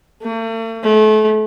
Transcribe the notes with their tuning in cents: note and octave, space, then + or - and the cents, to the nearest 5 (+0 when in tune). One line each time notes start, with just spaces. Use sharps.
A3 +45
A3 -35